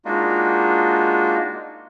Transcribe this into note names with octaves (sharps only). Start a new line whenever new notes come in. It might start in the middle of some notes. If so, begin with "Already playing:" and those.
G#3 A#3 D4 D#4 F4 F#4